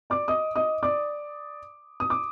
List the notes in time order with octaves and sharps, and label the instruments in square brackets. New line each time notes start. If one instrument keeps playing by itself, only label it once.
[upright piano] D5 D6
D#5 D#6
D#5 D#6
D5 D6
D#6
D6